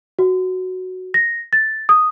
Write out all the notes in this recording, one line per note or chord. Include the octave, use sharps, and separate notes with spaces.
F#4
A#6
A6
D#6